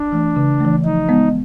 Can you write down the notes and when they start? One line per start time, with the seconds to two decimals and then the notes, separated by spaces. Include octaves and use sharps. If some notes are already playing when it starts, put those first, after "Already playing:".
Already playing: D4
0.12 E3 A3
0.36 C#3
0.61 E3 A3
0.84 F3 D#4
1.09 G#3 B3